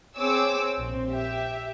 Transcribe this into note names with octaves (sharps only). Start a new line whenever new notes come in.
C4 G#4 C#5 D6 E6
A#1 C4
G4 E5